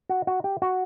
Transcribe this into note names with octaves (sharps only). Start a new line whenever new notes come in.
F#4
F#4
G4
F#4